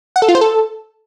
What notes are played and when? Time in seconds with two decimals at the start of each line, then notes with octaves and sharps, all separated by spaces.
0.16 F#5
0.22 A4
0.28 F4
0.35 C5
0.41 A4